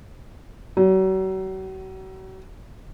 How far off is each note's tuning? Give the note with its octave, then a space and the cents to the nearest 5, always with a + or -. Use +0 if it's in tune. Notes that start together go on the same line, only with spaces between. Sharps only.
F#3 +40